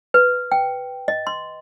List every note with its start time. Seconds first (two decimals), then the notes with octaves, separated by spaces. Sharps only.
0.14 B4
0.52 G5
1.08 D#5
1.27 C6